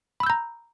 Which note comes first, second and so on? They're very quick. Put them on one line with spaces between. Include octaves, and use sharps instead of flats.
B5 E6 G6 A#5